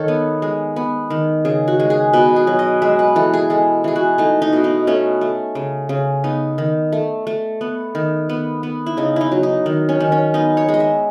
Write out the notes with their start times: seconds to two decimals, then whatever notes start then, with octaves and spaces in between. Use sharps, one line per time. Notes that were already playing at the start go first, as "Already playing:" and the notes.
Already playing: D#3 A4 C#5 D#5
0.08 B3
0.42 G#3
0.76 B3
1.10 D#3
1.45 C#3 G#4
1.68 F#4
1.80 G#3
1.90 G#4
2.13 B2 B4
2.36 G#4
2.47 F#3
2.59 D#5
2.82 G#3 E5
2.99 B4
3.16 E3 A4
3.34 G#4
3.50 G#3 A4
3.84 E3 G#4
3.96 F#4
4.18 A3 D#4
4.42 D#4
4.53 B2
4.64 D#4
4.87 A3 C#4
5.21 A3
5.55 C#3
5.89 C#3
6.24 B3 D#4
6.58 D#3
6.93 A3
7.27 A3
7.61 B3
7.95 D#3
8.29 B3
8.63 B3
8.86 E4
8.97 C#3 D#4
9.16 D#4 E4
9.32 F#3
9.43 D#4
9.66 D#3
9.89 C#4
10.00 D#3
10.12 C#4
10.34 B3 D#4
10.57 C#5
10.69 G#3
10.74 D#5
10.80 E5